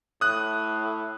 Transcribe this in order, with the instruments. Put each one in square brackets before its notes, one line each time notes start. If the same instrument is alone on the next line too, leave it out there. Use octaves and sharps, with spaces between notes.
[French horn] A2 [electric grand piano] D#6 F#6